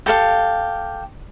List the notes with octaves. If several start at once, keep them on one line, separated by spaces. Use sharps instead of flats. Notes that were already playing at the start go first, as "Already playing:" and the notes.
G4 A4 F5